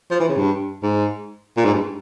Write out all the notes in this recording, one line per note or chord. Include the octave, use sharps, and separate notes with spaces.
F3
E3
C#3
G2
G#2
A#2
G#2
G2